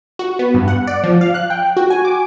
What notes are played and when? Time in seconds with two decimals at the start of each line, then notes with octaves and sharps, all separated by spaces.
0.19 F#4
0.39 B3
0.54 G2
0.68 F#5
0.87 D5
1.04 F3
1.21 F5
1.34 F#6
1.50 G5
1.77 F#4
1.90 G#5
2.05 D6